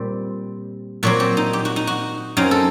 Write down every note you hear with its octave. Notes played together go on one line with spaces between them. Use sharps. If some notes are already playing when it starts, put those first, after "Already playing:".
Already playing: A#2 G3 C4
A#2 F#3 C4 F#4
G4
D#4
G4
F#4
D#4
F#4
F#2 F#3 C4 D#4
A4